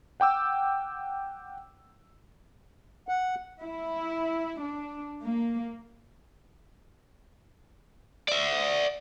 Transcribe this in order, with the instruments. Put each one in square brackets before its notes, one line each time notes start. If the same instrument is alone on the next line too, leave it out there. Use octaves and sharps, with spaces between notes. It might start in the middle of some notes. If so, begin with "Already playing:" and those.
[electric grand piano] F#5 G5 D6 E6
[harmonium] F#5
[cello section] E4
D4
A#3
[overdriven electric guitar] D5 E5